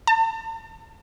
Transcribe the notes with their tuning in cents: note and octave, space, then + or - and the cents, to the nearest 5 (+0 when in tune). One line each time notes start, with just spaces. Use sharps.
A5 +45